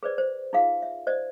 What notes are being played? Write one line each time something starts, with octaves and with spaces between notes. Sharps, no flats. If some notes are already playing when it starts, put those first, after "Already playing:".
G#4 B4 C5 D5
C5
D#4 F4 G#4 F5
E5
C5 D5 D#5